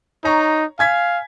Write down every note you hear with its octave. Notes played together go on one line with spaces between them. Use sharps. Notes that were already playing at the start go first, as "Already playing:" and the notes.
D#4 C#5 A#5 C#6
F5 G#5 G#6 B6